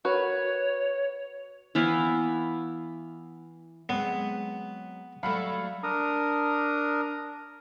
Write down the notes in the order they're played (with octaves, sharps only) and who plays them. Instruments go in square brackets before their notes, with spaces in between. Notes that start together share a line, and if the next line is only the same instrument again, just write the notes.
[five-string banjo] F#4 A#4 B4 [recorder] C#5
[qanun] E3 B3 E4 F5
[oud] F#3 G#3 C4 [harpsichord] B3
[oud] F#3 G3 A3 [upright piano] F5 B5
[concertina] D4 A#4 A#5 D#6